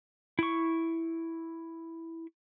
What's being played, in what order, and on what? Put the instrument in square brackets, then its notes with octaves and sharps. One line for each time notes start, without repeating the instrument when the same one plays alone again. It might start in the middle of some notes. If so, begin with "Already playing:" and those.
[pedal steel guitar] E4 C#6